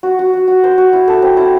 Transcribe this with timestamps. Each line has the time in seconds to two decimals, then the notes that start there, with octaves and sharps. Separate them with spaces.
0.03 F#4
0.19 F#4
0.33 F#4
0.48 F#4
0.64 C5
0.78 F#4
0.93 E4
1.08 A4
1.22 C4
1.37 E4